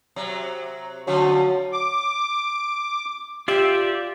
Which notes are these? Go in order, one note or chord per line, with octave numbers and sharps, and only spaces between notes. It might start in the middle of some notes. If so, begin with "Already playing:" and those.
C3 F#3
D3 F3 F#3 C#4
D6
F4 G4 D5 E5